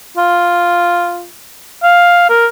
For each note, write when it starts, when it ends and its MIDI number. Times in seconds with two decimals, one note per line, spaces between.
0.17 1.27 65
1.83 2.27 77
2.29 2.46 70